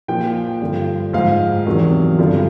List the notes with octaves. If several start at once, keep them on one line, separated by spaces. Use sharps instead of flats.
A#2 F3 G5
G2 D3 F3
G#2 F3 F5
E2 C3 D#3 F#3
G2 D3 F3